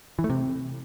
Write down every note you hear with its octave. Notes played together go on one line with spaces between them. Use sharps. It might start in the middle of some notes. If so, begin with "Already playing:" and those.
E3
A3
C3